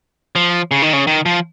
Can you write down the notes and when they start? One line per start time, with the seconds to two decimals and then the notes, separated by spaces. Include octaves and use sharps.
0.35 F3
0.71 C#3
0.82 D#3
0.93 C#3
1.07 D#3
1.26 F3